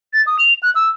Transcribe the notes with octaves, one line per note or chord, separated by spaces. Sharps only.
A6
D#6
F7
F#6
E6